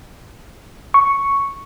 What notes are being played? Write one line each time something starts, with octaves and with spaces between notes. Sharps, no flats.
C#6